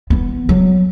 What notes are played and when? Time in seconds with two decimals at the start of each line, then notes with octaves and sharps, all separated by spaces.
0.10 E3 B3
0.49 F#3